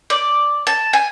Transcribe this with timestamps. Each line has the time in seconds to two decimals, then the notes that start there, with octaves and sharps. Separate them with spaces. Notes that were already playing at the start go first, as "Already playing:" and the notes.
0.10 D5
0.67 A5
0.93 G#5